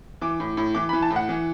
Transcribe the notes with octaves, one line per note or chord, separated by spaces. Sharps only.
E3 D6
A2
A2
E3 D6
E3 B5
A5
A2
F#5
E3